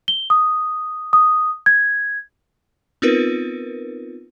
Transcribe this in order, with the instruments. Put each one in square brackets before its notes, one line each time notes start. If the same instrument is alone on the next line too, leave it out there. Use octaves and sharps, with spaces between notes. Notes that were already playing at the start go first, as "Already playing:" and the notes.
[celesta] G7
D#6
D#6
G#6
[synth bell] B3 C4 D#4 F4 A#4 B4